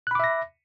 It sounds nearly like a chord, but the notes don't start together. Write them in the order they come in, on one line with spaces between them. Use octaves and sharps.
F#6 B5 D6 E5 A#6